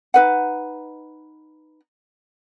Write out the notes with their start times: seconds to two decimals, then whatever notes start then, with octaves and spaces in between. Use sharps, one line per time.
0.14 D#4 B4 F#5